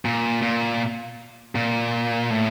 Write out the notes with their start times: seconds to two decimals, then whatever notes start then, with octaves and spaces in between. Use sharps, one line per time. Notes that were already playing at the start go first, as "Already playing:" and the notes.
0.05 A#2
0.42 A#2
1.55 A#2
2.31 A2